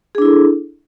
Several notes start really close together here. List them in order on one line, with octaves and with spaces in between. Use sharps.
G#4 D4 E4 A4